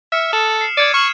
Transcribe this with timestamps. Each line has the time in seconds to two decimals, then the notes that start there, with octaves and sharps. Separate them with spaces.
0.12 E5 F6 C#7
0.32 A4 D#6 E7
0.61 C7
0.77 D5 G#6 C#7 D#7
0.94 C#6 F6 E7 F#7